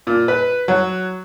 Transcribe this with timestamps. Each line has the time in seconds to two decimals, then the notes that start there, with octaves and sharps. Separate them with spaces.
0.07 A#2
0.28 B4
0.68 F#3